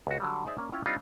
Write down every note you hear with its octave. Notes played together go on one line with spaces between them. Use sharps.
C#2 F#4
D3 F#3 G3
D#4 G#4 C5 D5 E5
A#3 C#4 D5
C#4 E4 F4 C#5 F5 G5
G3 C4 D4 D#4 F4